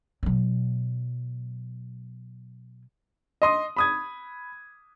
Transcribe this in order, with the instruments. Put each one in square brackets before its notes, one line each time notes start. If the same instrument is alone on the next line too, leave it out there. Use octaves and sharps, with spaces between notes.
[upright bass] B2 F#3
[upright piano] D#5 C6 D#6
B5 D#6 G#6